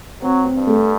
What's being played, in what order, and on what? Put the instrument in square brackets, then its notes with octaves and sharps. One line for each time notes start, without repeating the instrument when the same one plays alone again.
[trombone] F#3 [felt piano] C4
[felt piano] C4
[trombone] G2
[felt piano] A3